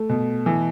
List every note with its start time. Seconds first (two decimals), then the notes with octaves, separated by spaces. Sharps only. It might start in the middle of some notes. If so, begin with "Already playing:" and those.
Already playing: A3
0.09 B2
0.46 E3